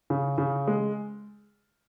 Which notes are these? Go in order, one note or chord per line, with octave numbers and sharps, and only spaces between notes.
C#3
C#3
G#3